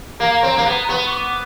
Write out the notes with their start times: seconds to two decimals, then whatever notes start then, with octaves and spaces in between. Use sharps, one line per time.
0.20 A#3 A#5
0.43 C4
0.57 A#3
0.66 B3
0.88 B3 C#6
1.12 D6